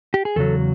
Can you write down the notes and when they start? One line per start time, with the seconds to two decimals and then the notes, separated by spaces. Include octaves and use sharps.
0.14 G4
0.25 G#4
0.36 E2 C#3 F#3 A4